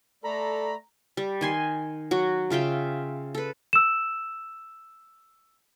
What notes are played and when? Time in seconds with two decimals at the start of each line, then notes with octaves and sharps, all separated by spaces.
0.24 A3 A4 D5 A#5 B5
1.17 G3
1.41 D#3 G#5 C6
2.11 F#3 F#4
2.50 C#3 F4 E5 G5
3.35 A4 B4
3.73 E6 E7